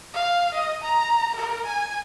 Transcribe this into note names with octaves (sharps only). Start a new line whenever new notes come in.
F5
D#5
A#5
A#4
G#5